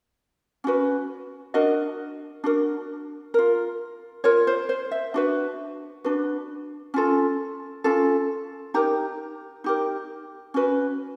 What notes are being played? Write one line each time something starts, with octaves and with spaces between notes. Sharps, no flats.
C#4 F#4 B4
D4 F#4 A#4 D#5
D4 F#4 A#4
F4 A#4
F4 A#4 C#5
C5
C5
E5
D4 F#4 B4
D4 F#4 B4
C#4 F4 A4
C#4 F4 A4
D#4 G4 A#4 A#5
D#4 G4 A#4
C#4 F#4 B4